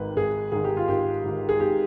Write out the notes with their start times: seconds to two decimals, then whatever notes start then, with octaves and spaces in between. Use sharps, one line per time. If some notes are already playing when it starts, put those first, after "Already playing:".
Already playing: G#1 G#2 D#3 B4
0.16 G#1 G#4
0.52 G#2 D#3 G#4
0.64 G4
0.77 F4
0.88 G#1 G4
1.24 G#2 D#3
1.49 G#4
1.60 G#1 G4